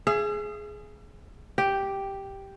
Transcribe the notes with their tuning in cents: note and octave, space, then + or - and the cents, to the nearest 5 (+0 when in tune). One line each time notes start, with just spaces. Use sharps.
G#4 +10 E5 +45
G4 +0 G5 +0